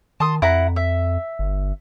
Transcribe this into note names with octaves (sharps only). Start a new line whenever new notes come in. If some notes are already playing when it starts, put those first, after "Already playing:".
D#3 A5 C6 D#6
F2 E4 F#5 A#5
E5
G1